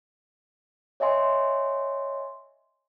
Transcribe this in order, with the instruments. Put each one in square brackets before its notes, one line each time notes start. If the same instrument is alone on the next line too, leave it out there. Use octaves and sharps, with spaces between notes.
[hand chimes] C#5 D#5 E5 G#5 C6